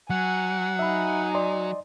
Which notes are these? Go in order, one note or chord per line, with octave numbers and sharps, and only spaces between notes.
F#3 F#5 G#5
D#4 E5 G#5 B5
D5 D#5 C6